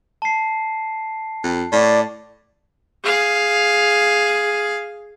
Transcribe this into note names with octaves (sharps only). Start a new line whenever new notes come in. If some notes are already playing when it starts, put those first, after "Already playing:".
A5 C7
F2
A2 D5
G#4 F5